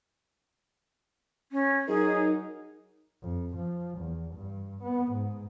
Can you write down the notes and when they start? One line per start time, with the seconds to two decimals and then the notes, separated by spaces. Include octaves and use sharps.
1.52 C#4
1.88 F#3 D#4 G#4 A#4
3.22 F2
3.56 F3
3.99 E2
4.35 G2
4.83 B3
5.12 G#2